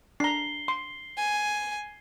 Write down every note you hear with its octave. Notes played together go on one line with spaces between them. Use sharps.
D4 A#5 C7 G7
C6
G#5